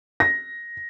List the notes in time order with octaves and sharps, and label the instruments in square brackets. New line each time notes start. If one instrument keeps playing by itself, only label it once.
[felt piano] A#6